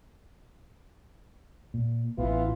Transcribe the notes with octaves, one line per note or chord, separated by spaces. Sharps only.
A#2
A1 E3 B3 F4